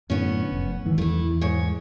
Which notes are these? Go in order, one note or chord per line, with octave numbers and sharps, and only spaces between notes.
F#2 A2 D3 B3 C#4
F1
G#2 D#3 E3
E2 A3 E4
G#2 C#5